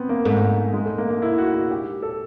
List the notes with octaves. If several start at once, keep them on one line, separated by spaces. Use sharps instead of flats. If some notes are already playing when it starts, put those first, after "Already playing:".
Already playing: B3 C4
A#3
G#2 A3
G#3
A3
A#3
A#3
E4
F#4
F#4
G4
A4